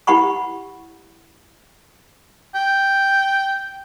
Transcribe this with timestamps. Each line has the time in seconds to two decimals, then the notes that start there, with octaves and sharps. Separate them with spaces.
0.07 E4 G4 F#5 B5 C#6
2.55 G5